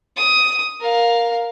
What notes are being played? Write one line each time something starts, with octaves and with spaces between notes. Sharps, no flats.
D#6
A#4 F5